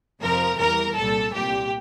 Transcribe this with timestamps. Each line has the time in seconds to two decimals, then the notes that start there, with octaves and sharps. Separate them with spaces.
0.21 F2 C3 F3 A#4
0.59 E2 E3 G3 A#4
0.96 C2 A#2 G3 A4
1.34 C2 A#2 G3 G4